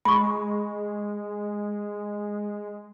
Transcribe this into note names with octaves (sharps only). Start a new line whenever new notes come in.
G#3 B5 C#6